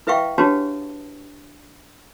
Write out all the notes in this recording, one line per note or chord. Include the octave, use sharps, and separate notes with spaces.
E4 B4 E5 F5 G5 C#6
D4 F#4 G4 B4 C#5 A5